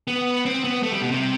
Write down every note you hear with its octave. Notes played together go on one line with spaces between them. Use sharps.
B3
C4
B3
A3
G3
B2
C3